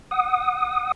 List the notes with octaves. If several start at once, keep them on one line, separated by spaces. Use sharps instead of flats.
F#5 D#6